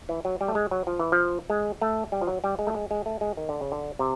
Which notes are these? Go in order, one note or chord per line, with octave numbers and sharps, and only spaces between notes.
E3
F#3
G3
A3
G#3
F#3
F3
E3
F3
G#3
A3
G3
F3
F#3
G3
G#3
A3
G#3
G#3
A3
G#3
D#3
D3
C#3
D3
C3